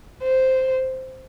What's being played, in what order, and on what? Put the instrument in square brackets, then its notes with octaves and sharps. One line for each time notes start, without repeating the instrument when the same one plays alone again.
[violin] C5